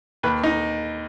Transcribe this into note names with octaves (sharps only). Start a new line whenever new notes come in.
D#2 B4
D#4